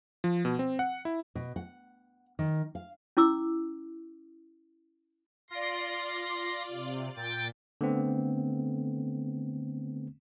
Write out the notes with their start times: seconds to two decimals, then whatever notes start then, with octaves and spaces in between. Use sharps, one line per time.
0.24 F3
0.45 B2
0.59 C4
0.79 F#5
1.05 E4
1.35 B2
1.56 F#5
2.39 D#3
2.75 F5
3.17 C#4 E4 D6 E6
5.50 F4 D5 C6 A#6
6.71 C3
7.17 A#2 G5 A6
7.81 D3 A3 B3 C4